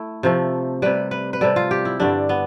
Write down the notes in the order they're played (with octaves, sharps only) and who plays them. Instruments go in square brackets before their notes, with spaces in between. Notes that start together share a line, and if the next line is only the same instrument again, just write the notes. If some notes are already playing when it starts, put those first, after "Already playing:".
Already playing: [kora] A3 E4
C3 F3 A3
C3 G3 B4
B4
B4
C3 G3 A4
F4
G4
E4
G2 D3 G3 D4
B3